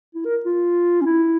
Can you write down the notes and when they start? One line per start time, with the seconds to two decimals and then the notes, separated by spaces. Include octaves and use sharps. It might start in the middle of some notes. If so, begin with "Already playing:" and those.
0.15 E4
0.25 A#4
0.45 F4
1.01 C#4
1.05 E4